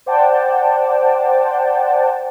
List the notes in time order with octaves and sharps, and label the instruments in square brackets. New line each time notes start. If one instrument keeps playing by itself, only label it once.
[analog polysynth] C5 D5 F#5 G5 A5